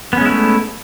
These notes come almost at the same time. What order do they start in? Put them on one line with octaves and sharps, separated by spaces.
B3 C#4 G#3 E4 A3